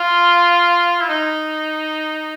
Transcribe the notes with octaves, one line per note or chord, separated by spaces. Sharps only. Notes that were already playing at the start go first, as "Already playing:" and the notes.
Already playing: F4
E4
D#4